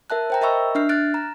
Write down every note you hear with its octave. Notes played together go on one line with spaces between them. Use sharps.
A#4 E5 A5 F#6
C5 G5 A#5
A#4 D#5 E5 B5 C#6 E6
D4 E5 F6 C7
F6 F#6 A6 D7
A#5